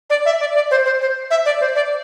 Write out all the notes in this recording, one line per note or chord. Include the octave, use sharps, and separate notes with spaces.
D5
E5
D5
D5
C5
C5
C5
E5
D5
C5
D5